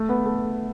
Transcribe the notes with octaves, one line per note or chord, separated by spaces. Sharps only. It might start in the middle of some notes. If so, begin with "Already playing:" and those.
Already playing: A3
B3
A3